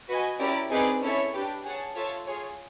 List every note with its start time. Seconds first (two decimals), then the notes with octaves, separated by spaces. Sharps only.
0.08 F#4 B4 D#5 G#5
0.39 C#4 E4 G4 A#4 D5
0.70 C4 D#4 G#4 B4 D5
1.01 C#4 E4 A4 C#5 E5
1.33 D4 G4 B4
1.64 G#4 C#5 F#5 A5
1.95 F4 A4 C#5 E5 A5
2.26 F4 G#4 C#5